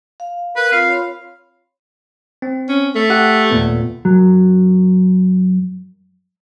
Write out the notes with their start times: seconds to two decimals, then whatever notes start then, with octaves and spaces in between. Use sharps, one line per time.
0.20 F5
0.56 A#4 B4
0.72 C4 F4 F5
0.88 C#5 B5 C6
2.42 C4
2.69 C#4
2.95 A3
3.10 G4 A4 F#5
3.50 D#2 A#2 B3
4.05 F#2 F#3